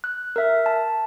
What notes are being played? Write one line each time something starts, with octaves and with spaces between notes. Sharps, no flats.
F#6
A#4 E5
A5